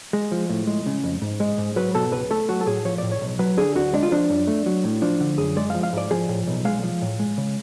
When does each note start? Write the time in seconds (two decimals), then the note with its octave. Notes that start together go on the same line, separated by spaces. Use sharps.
0.13 G#3
0.32 F3
0.50 A2
0.67 G#3
0.86 C#3
1.04 F2
1.22 G#2
1.40 G#3
1.58 G#2
1.76 F#3 B4
1.95 B2 A4
2.12 C#2 B4
2.31 A3 A4
2.49 F#3 F#4
2.61 A4
2.67 A2 G#4
2.85 F3 C#5
2.98 A2 D5
3.12 C#5
3.22 B1
3.39 F#3 B4
3.57 D3 G#4
3.75 D2 F#4
3.93 G#3 D4
4.03 F4
4.12 F3 D4
4.30 F#2
4.47 A3
4.66 F#3
4.84 A2
5.02 F3 D4
5.20 D3
5.38 F#2 G#4
5.57 G#3 D5
5.70 F5
5.75 F3
5.83 F5
5.93 G#2 D5
6.11 F3 G#4
6.29 A2
6.47 B1
6.65 G#3 F5
6.83 F3
7.02 A2
7.19 G#3
7.38 C#3